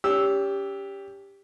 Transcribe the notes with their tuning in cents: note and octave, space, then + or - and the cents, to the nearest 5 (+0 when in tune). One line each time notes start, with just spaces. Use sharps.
C#4 +40 G4 +10 E6 -10